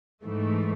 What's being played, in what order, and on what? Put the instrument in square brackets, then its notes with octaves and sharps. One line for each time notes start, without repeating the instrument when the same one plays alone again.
[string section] G#2 E3 A3